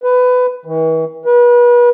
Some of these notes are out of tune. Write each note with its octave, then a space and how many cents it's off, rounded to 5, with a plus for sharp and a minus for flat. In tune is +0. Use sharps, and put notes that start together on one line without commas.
B4 +20
E3 -40
B4 -35